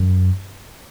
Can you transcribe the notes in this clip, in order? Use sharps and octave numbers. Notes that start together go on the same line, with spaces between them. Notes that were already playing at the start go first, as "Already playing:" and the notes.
Already playing: F#2